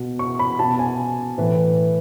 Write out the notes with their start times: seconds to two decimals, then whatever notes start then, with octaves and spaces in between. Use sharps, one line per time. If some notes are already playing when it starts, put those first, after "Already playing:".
Already playing: B2
0.19 C#6
0.39 B5
0.59 B2 A5
0.79 G#5
1.38 A2 E3 B4